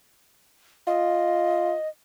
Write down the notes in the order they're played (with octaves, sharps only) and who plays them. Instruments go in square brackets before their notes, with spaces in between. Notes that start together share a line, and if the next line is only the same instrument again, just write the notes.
[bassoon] F4 [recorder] D#5